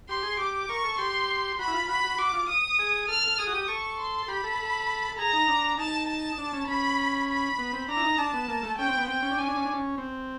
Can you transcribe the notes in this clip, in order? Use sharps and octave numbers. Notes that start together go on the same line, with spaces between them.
G4 C6
G#4
G4 D6
A#4 C#6
A4
G4 C6
F#4 B5
E4
F4
F#4 B5
F#4
F#4 D6
F4
D#6
G#4
A4 F6
A4
G#4 D#6
F#4
G4
A4 C#6
C6
G4 B5
A4
A4
A4
G#4 A#5
D#4
D4
D#4 A5
A5
D4
C#4
C#4 B5
B5
B3
C4
D4 A#5
E4
D#4
D4 A5
B3
A#3
A3
C#4 G5
C4
B3
C4 G5
C#4
D4
C#4 G#5
D4
C#4
D4
C#4
C4